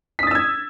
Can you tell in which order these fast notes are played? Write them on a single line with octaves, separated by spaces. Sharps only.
B6 D#6 A6 E6 G#6